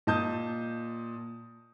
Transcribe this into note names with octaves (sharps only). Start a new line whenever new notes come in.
A#2 D#5 A5 D#6 G6